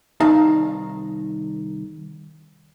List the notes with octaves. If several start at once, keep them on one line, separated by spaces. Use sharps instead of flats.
C2 D#3 D#4 F5 A5 A#5